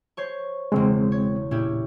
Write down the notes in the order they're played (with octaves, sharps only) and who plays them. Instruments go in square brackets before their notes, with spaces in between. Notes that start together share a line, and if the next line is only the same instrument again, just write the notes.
[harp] C5 C#5 C#6
[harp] E1 C#3 [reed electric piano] G#3 C4
[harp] C#5
[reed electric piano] A#2 [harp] C#4 E4 G4